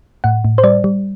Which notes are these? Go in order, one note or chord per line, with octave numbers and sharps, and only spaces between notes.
A2 F#5
A2
C5
G3 D5
G3